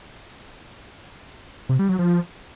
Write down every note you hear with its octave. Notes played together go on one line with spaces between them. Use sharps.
C3
G3
F#3
F3